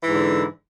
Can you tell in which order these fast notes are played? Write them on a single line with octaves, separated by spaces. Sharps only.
E3 G#2 D3